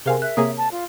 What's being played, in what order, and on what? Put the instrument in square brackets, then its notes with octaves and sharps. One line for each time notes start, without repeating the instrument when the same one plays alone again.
[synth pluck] C3 F5 [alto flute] C4 [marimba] G#4 A#4 G#5
[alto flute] E5 [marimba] F#6
[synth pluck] C3 A#3 G#4 [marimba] C#5 A#5 D#6
[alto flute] A5
F4